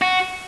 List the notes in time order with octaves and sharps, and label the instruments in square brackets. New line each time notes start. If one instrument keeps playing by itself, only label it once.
[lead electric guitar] F#4